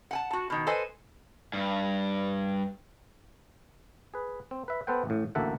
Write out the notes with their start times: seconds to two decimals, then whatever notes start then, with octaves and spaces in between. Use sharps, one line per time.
0.11 F#5 G#5 A5
0.31 F#4 A5
0.50 B2 D#3
0.67 A4 B4 C5 D#5 G#5
1.53 G2
4.14 G#4 B4
4.51 C4
4.68 B4 E5
4.87 B3 A4 B4 C5 F#5 G5
5.05 A1 A2
5.35 A1 D2 A#3 A4 E5 F#5